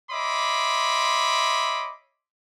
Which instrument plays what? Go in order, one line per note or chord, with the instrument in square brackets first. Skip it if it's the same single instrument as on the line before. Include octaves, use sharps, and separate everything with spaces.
[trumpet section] C#5 D#5 E5 B5 C6 D6